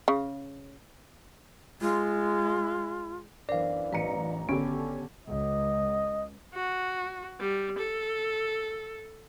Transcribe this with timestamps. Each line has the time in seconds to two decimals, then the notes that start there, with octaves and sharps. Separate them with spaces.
0.08 C#3
1.81 G#3 F4
3.49 B1 F#2 E3 D4 A#4 C5 D5 F5
3.93 A1 B4 D#5 A#5 C#7
4.49 G#1 D3 B3 C#4 G4 A4
5.27 C#2 D#5
6.55 F#4
7.40 G3
7.79 A4